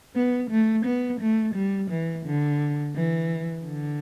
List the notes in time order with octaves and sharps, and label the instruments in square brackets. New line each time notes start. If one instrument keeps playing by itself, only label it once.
[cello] B3
A3
B3
A3
G3
E3
D3
E3
D3